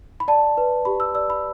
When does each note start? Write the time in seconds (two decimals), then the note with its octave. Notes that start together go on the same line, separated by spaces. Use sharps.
0.20 B5
0.28 D5 A5
0.57 B4
0.85 G4 B5
1.00 E6
1.15 D5 E6
1.30 B5